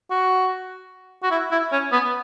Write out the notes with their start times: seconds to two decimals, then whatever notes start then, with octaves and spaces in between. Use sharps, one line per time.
0.11 F#4
1.23 F#4
1.31 E4
1.51 E4
1.72 C#4
1.92 B3